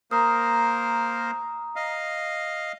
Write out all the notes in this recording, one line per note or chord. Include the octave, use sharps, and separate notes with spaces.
A#3 A#4 C5 A#5 D#6
D#5 F5